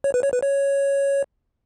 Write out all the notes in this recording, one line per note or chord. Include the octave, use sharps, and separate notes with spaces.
C#5
B4
C#5
B4
C#5